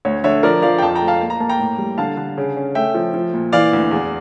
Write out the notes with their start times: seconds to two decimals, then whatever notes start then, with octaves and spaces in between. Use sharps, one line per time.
0.05 D2 C#5
0.24 D3 C#5 E5
0.43 F3 A#4 D5
0.62 F3 D5 F5
0.78 G5
0.82 F2 F5 A5
0.95 G5 A#5
1.01 A3
1.07 F5 A5
1.21 A#3
1.30 A#5
1.40 A#3 A5
1.49 G5 A#5
1.59 A2
1.78 G3
1.98 D3 F5 A5
2.17 D3
2.38 C#3
2.57 C#4
2.75 A3 E5 G5
2.94 F3
3.14 F3
3.34 A#2
3.53 E3 D5 F5
3.73 D2
3.91 E2